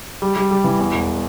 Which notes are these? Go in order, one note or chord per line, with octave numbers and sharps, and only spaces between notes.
G3
G3
G3
E3
E2
E1